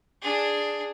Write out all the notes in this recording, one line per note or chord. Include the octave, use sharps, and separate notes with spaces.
D4 G#4